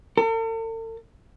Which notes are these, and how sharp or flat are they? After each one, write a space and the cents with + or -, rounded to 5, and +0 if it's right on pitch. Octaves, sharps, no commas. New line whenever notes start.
A4 +45